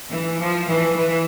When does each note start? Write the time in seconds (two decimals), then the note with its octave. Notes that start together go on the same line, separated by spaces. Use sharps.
0.11 E3
0.39 F3
0.67 E3
0.95 E3